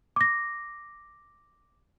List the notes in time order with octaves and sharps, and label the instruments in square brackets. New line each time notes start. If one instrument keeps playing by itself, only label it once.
[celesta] D6 A#6